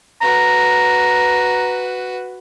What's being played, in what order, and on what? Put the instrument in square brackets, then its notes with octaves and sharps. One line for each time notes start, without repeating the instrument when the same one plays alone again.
[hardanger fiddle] F#4 B4 [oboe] A#5